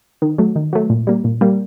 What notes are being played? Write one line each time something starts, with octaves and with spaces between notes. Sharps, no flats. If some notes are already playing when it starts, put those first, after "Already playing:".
D#3
F#3 A3
D#3
F#3 A3
A#2
G3 A#3
A#2
G3 A#3